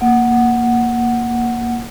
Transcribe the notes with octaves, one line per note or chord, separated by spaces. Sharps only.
A#3 F#5